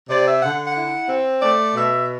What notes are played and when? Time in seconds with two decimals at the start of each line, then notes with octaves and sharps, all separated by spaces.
0.10 C3 D5
0.26 E5
0.42 D3 F#5
0.67 F#5
0.76 E4
1.09 C4
1.42 A3 D5
1.76 B2 E5